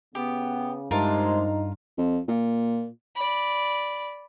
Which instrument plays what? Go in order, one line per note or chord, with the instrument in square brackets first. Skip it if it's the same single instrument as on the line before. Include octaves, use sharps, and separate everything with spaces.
[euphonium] C#3 [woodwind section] B3 [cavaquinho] G4
[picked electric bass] G2 [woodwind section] C3 G#3 [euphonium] D#4 [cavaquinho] F4 A#4 A5
[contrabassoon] F2
A#2
[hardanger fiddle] D5 B5